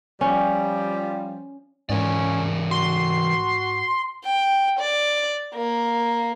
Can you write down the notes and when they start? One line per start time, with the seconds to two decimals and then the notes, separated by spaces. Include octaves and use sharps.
0.21 F3 G3 C#4
1.90 G#2 E3 C#4 A#4 D5
2.71 F#4 C6
4.25 G5
4.80 D5
5.55 A#3